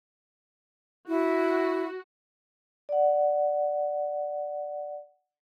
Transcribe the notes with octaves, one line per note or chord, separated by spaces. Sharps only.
E4 F#4
D5 F#5